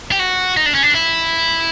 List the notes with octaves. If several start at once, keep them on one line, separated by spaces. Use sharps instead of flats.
G4
F#4
D#4
D4
C#4
D4
E4